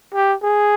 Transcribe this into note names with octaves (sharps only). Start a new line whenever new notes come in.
G4
G#4